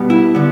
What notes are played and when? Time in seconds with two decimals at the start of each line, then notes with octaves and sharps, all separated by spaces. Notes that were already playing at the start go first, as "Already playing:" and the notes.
Already playing: B2 G3 B3
0.10 E4
0.35 D3 B3